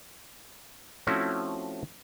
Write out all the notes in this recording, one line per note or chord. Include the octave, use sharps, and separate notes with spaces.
F3 A3 C4 C#4 E4 F#4